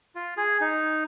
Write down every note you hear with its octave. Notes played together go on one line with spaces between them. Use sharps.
F4
G#4
D#4